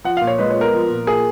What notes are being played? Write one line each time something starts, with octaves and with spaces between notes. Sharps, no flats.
F3 F#5
A#2 F5
C#5
G#3 B4
C#5
B3 A#4
F3
A#2
A#3 G#4